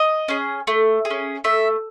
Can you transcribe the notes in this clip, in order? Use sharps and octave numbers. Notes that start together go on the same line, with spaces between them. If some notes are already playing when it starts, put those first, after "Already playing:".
Already playing: D#5
C#4 G#4
A3
G#4
C#4
A3 E5